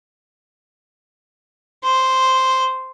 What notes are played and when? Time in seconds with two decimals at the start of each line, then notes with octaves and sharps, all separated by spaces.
1.83 C5